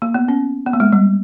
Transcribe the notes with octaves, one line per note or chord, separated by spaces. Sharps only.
A#3
B3
C#4
B3
A#3
G#3
G3